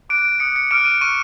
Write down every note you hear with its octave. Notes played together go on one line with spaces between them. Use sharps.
D6 F#6 D7
D#6 F#6 C#7
C#7
D6 F6 D7
D#7
C#6 F6 D#7